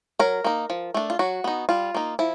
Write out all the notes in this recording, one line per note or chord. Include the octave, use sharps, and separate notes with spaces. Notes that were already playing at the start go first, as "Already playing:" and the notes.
F#3 A#4
A#3 D#4
F3
A3 D4
F4
F#3 F#4
B3 D#4
G3 F4
A#3 D#4
F3 E4